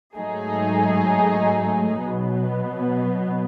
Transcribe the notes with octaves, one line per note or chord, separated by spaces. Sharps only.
G#2 F#3 A3 D#4 G#4
B2 F#3 B3